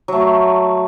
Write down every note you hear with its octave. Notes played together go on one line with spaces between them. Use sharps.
F#3 A3